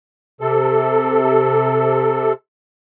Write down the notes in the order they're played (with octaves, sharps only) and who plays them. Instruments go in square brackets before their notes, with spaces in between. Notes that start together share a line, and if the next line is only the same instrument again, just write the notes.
[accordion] C3 A4